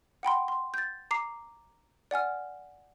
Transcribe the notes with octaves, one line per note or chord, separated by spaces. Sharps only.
F#5 G5 B5 C6
C6
G6 A6
A#5 D6 C7
D5 F#5 G#5 F6